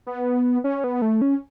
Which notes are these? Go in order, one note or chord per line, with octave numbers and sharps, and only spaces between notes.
B3
C#4
B3
A3
C#4